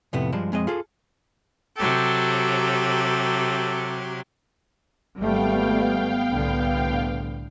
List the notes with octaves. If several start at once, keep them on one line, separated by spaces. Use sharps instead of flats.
F2 A2 C3 A3 B3
G2 F3 G#3 D4
F2 G#3 C4 D#5
F4 G#4 A4
C3 F#3 G4 A4
G#1 G3 A3 B3 F5 G5
C2 A2 D3